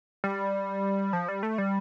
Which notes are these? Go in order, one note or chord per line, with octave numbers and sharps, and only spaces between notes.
G3
F3
G3
A3
G3